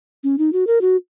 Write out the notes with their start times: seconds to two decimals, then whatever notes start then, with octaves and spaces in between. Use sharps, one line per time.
0.24 C#4
0.38 D#4
0.53 F#4
0.67 A#4
0.81 F#4